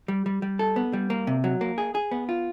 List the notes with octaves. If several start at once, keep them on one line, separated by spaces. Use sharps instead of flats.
G3
G3
G3
A4
B3
G3
A#3
C3
F#3
A#3
G#4
G#4
B3
F4